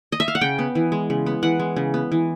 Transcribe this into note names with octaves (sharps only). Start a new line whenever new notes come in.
D#5
E5
F5
F#5
C#3 G5
B3
E3
G#3
C#3
B3
E3 F#5
G#3
C#3
B3
E3